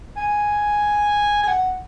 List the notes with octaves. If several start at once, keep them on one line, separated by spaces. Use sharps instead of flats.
G#5
G#5
F#5